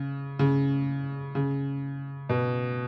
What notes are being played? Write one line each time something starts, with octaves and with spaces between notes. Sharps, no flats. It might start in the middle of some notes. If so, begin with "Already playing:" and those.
Already playing: C#3
C#3
C#3
B2